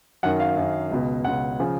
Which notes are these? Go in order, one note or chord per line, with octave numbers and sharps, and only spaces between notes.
F#2 D#3 F#5
F5
F#2 D#3
C#2 B2
C#2 B2 F#5
C#3 F3